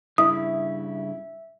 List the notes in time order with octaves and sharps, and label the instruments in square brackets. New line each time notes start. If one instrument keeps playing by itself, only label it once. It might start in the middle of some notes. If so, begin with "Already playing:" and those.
[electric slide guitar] G2 C#3 [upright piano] E4 [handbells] E5 [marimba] D#6